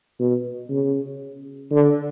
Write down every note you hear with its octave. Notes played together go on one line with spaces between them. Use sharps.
B2
C#3
D3